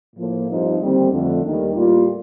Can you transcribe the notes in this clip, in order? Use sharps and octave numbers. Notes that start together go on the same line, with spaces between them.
A2 F3 A#3
G2 F3 C4 D#4
D#2 D3 G3 C4
F2 D3 A3
D#2 D#3 G3
A2 G3 A#3 F4